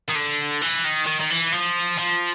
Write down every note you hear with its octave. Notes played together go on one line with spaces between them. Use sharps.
D#3
D3
E3
D#3
D#3
D#3
E3
F3
F3